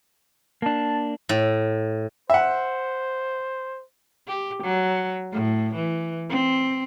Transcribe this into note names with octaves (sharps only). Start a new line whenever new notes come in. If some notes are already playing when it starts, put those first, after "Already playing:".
A#3 D4 A5
A2
C5 E5 F#5
G4
F#3
A2
E3
C4